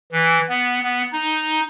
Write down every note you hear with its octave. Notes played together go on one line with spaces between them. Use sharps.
E3
B3
B3
D#4